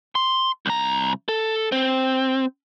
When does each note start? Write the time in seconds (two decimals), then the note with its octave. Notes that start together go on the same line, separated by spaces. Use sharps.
0.15 C6
0.66 C2 A#5
1.29 A4
1.72 C4